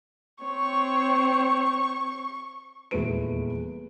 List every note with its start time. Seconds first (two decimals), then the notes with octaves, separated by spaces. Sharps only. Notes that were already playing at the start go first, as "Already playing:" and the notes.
0.44 C4 C#5 C#6
2.91 D#1 E2 G#3 A3 B4 D7